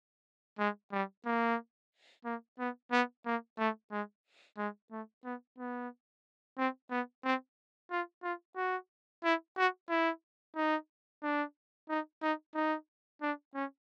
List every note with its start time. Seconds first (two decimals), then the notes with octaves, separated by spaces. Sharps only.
0.59 G#3
0.92 G3
1.26 A#3
2.25 A#3
2.59 B3
2.92 B3
3.26 A#3
3.59 A3
3.92 G#3
4.58 G#3
4.91 A3
5.25 B3
5.58 B3
6.58 C4
6.91 B3
7.24 C4
7.91 F4
8.23 F4
8.57 F#4
9.24 E4
9.57 F#4
9.89 E4
10.56 D#4
11.23 D4
11.89 D#4
12.22 D#4
12.55 D#4
13.22 D4
13.55 C#4